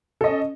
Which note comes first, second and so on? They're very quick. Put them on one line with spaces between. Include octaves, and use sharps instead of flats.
A4 D#5 C#4